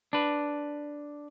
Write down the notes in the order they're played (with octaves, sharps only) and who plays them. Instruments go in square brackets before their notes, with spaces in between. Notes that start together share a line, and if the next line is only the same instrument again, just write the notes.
[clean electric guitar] D4 B4